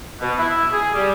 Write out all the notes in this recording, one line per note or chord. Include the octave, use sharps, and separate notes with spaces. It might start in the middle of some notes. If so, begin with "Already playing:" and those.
B2
E4
G#4
G3